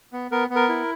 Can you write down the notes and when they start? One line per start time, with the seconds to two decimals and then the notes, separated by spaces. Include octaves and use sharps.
0.13 B3
0.31 B3 A#4
0.50 B3
0.55 A#4
0.69 E4